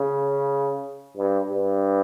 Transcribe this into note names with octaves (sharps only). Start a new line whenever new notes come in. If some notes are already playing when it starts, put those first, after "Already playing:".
Already playing: C#3
G2
G2